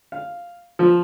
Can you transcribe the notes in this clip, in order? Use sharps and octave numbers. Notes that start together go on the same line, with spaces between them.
F5
F3